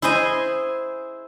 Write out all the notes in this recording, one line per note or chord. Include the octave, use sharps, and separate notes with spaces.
E4 G#4 C5 D#5 G#5